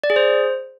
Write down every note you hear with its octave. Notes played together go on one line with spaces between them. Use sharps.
D5
G#4
C5